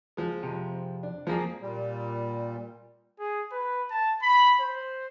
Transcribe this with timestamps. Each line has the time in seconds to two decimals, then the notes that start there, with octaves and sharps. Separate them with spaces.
0.17 F3 G#3
0.43 F2 C3
1.03 D4
1.27 F2 F3 A#3 G#4
1.61 A#2 G3
3.20 G#4
3.52 B4
3.91 A5
4.22 B5
4.60 C5